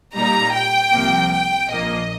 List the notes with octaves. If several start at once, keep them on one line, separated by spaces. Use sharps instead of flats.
A#2 G3 D#4 A#5
G5
C2 C3 F3 A#3
G5
A#1 A#2 F3 A#3 D#5